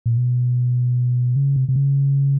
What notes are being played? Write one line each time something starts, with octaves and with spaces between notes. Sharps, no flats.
A#2
B2
C#3
C3
C3
C#3